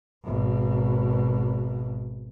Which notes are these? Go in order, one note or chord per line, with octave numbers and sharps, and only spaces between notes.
G#1 B2